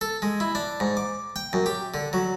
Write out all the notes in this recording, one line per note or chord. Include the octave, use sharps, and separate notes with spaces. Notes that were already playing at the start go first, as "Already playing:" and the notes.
A4
G#3
E4
D4
G#2
D6
G5
F#2
G4
D3
F#3